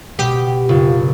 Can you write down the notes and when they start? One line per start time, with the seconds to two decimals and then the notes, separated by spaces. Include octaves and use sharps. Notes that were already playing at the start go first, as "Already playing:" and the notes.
0.19 B2 G4
0.69 F#1 F4